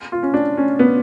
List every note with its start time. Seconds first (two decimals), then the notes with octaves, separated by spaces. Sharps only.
0.12 F4
0.23 C#4
0.34 D4
0.57 C#4
0.79 B3